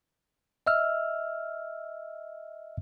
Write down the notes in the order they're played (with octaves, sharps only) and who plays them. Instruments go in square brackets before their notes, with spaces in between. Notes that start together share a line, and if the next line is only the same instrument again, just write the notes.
[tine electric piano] D#5 E5 E6 F6